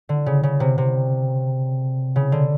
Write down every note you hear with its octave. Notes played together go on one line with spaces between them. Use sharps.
D3
C#3
C#3
C3
C3
C#3
D3